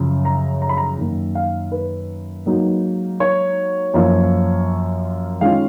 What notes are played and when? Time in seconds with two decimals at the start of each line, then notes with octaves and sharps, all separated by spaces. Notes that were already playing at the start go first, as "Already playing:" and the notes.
Already playing: F#2 C#3 F3
0.25 A#5
0.62 A#5
0.69 B5
0.77 A#5
0.98 F#2 D#3 A#3 D#4
1.35 F5
1.72 B4
2.46 G#2 F#3 A#3 D#4
3.20 C#5
3.94 F#2 F3 A#3 F4
5.41 D#3 G#3 C#4 F4 F5